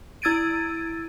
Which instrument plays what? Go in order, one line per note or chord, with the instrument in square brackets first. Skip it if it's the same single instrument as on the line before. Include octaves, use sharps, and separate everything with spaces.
[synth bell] E4 E6 G#6 A6 D7 D#7